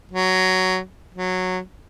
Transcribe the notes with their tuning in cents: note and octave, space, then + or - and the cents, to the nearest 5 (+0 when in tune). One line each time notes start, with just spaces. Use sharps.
F#3 +10
F#3 -10